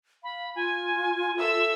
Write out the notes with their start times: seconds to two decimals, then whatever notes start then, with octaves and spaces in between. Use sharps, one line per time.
0.24 F5 B5
0.56 F4 G#5
1.38 A4 E5 E6